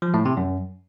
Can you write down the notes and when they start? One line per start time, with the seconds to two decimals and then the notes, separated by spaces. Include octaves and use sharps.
0.02 F3
0.14 A2
0.25 C3
0.37 F#2